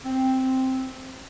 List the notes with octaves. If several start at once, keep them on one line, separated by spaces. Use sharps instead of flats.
C4